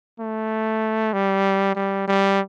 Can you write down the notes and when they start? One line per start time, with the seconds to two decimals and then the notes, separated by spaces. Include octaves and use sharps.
0.20 A3
1.13 G3
1.75 G3
2.08 G3